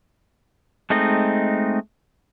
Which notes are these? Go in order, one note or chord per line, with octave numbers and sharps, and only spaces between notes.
G#3 A3 C4 D#4 D#5